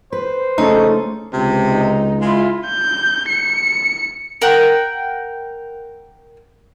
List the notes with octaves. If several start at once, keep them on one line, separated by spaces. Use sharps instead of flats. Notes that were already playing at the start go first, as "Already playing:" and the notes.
B4 C5
A#1 C#3 A3 C#4 D#4 A4
C#2 C3
D#4
G#3 E4 F4
G6
C#7
A#4 F#5 G5